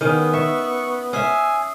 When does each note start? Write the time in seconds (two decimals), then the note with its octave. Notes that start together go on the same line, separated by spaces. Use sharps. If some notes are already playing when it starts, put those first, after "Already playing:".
0.01 D#3 B3 C#4 G#4 D#6 D#7
0.34 E5 C#6
1.13 C#4 E5 G#5 D#6 E6 C7